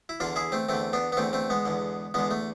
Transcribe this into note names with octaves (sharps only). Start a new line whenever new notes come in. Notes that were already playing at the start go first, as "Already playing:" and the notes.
E4
E2 D3 D4 F4
E4 G#4
A3 C4
E2 D3 A3 C4
B3 D4
B3
E2 D3 A3 C4
A3 C4
G#3 B3
E2 D3
E2 D3 G#3 B3
A3